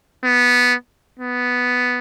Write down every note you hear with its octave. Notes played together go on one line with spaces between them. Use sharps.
B3
B3